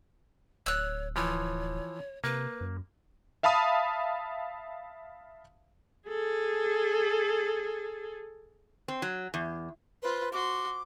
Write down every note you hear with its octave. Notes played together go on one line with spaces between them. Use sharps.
D1 C#5 E6 F#6
E3 F3 C#5
C3 A#3 B4
F#2
E5 F5 A5 B5 D#6
G#4 A4
C4
F#3
E2
F4 B4 C5
F#4 C6 D6